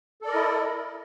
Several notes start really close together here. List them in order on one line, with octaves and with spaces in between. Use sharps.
A4 D5 A#4 D#5 E4